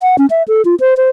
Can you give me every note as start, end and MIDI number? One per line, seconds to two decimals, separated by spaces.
0.02 0.16 78
0.18 0.26 61
0.30 0.43 76
0.48 0.62 69
0.65 0.75 65
0.80 0.97 72
0.97 1.09 72